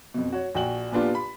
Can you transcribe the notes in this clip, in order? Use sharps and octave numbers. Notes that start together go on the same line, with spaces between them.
F2 B2
F#4 C#5
A#1 F#4 G5 F#7
A#2 B3 D4 F4 G4
B5